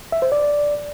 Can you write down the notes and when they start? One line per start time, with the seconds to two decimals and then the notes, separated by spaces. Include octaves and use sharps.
0.12 E5
0.22 C5
0.32 D5